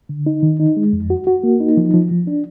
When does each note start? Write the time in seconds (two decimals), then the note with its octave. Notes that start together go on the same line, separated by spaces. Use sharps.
0.09 D3
0.26 D#4
0.43 D#3
0.60 D#4
0.77 G#3
0.93 F2
1.10 F#4
1.27 F#4
1.44 A#3
1.60 D#4
1.77 F3
1.94 F3
2.11 F3
2.27 D4